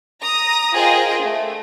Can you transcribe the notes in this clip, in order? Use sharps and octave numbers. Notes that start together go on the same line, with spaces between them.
A#5 D#6
F4 G#4 A#4 C5 D#5 G5
A3